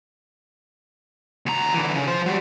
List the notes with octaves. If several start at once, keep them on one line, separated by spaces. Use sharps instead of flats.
D2 A#5
D3 E3
C#3
F3 C5
F#3 G3